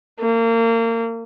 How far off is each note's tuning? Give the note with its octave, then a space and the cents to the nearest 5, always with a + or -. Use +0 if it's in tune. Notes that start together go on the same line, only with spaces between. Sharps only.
A#3 -30